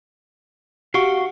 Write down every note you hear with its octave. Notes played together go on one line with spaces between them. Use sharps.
F#4 G4 F5 C#6